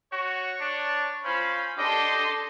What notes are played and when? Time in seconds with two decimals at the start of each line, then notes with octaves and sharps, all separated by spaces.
0.13 F#4 C#5
0.60 D4
1.25 C#4 C5 F5 B5
1.79 D4 G4 A4 D#5 G5 C6 D6